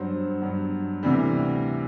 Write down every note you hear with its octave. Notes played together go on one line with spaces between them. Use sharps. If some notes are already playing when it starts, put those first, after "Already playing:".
Already playing: G2 F#3 C5
G2 F#3
D2 C3 E3 G3